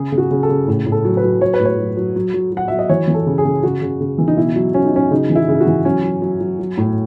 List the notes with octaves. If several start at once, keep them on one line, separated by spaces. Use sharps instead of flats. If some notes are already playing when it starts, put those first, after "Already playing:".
Already playing: C#3 G#4
C#3
F#4
C#3
A4
C#3
A2
A2
A4
F#3
B4
F#3
F#3 C#5
B4
A2
C#5
F#3
F#3
F#3
F#3
F#3 F#5
F#3 E5
D#5
E3 C#5
E3
A4
C#3
G#4
C#3
C#3 F#4
C#3
C#3
E3
D#4
B2 E4
F#3
F#3 C#4
D#4
F#3 C#4
C#3 D#4
E3
E4
C#3
F#4
E3
F#3 C#4
F#3
F#3
F#3
F#3
A2